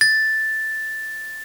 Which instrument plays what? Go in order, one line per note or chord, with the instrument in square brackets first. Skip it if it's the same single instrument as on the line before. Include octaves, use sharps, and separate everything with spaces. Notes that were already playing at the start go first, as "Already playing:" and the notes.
[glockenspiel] A6